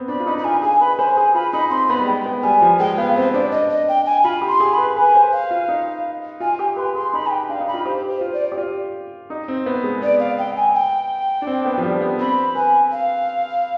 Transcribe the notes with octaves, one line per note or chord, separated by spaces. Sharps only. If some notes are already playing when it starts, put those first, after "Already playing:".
Already playing: B3 C4
D4 B5
F4
D#4 B5
D#4 B5
F4 G#5
G#4 G#5
B4 B5
C5 G#5
G#4 G#5
F4 B5
D#4 B5
C4 C6
B3 B5
G3
G#3 G5
B3
G3 G#5
F3
G#3 G5
B3 F5
C4 C5
D4 D5
D#5
D#5
G5
G#5
F4 B5
G4
C6
G#4
B5
B4
B4 G#5
C5
F5
F4
D#4
F4 G#5
G4 G#5
B4 C6
G#4 C6
D#4 B5
G#5
G5
D4 F5
D#4
B5
F4
G4 C5
C5
F4
D5
G4
F4
D#4
C4
B3
G#3
B3 D5
F5
G5
G#5
G5
D4
C4
B3
F3
G3
B3
C4 B5
B4 G#5
F5